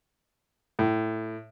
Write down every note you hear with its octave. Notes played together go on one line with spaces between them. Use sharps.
A2